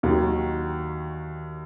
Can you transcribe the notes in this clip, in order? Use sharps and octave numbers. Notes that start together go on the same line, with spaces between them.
D#2 D#3 F#3